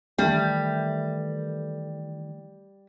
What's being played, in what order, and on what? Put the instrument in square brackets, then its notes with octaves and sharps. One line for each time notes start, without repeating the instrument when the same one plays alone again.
[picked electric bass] D#3 E3 A3 [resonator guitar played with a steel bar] G3